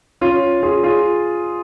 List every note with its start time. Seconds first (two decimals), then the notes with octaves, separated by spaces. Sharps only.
0.21 C#4 F4
0.63 F4 G#4
0.83 F4 G#4